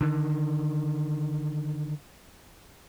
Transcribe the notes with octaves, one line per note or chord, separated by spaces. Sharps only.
D3 D#3